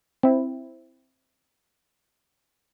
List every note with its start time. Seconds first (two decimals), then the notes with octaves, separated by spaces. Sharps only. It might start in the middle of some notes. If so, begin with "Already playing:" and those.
0.23 C4 E4